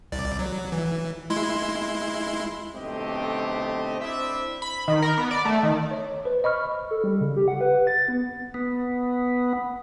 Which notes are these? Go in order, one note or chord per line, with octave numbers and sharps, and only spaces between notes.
C2 D5
F#3
E3
G#3 E4 C6
B1 D3 A3 C4 G4 D#5
C4 D4 E4 C5 D5 E5
B5
D#3
A#4
B3
D5
A3
D#3
C#5
B4 C5
D#5 B5 C#6 F6
A4
G3
C#3
G4
F#5
B4
A6
B3
B3